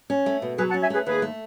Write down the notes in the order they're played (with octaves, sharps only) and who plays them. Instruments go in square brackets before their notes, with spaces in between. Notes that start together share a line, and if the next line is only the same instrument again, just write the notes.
[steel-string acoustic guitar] C#4
A3
B2
[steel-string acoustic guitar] F#3 [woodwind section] G#4 B4
[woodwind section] F#5 A5
[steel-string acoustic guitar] C#4
[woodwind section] E5 G#5
[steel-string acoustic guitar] A3 [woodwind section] G#4 B4
[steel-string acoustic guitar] D#2 [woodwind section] G#4 B4
[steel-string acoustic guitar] A3